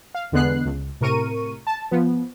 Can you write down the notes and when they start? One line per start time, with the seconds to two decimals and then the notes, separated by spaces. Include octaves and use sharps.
0.15 F5
0.32 E2 D3 G#3 B3 F#6 C7
0.65 C#2
1.01 A2 C3 A#4 C#6 D#7
1.67 A5
1.91 F3 B3